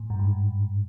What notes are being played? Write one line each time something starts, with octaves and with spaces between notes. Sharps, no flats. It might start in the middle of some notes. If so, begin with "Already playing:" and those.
Already playing: A2
G2
G#2